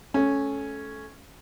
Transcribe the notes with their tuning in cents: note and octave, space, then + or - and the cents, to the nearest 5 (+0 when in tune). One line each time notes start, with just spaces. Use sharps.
A3 -25 C#4 +0